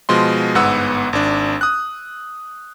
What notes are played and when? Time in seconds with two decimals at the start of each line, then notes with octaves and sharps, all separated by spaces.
0.09 B2 F3 G#3 C6
0.55 G1 G#2 B3 F#5 E6
1.13 G#1 D4
1.61 D#6 F#6